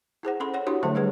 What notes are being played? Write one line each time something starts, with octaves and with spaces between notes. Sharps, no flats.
E4 G#4 C5 F#5
C#4 A4 B5 C6
C#5 F#5
D4 E4 F#4 G4 C#5 C6
D3 F#3 A3 A4 C5 E5
G3 G#4 B4